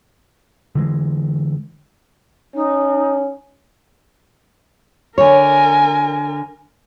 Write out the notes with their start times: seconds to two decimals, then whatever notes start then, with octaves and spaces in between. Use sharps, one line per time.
0.75 D3 E3 G#3
2.54 C#4 D#4
5.18 D3 A#4 C#5 G#5